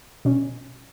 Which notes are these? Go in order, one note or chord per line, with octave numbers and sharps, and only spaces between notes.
B2 C#4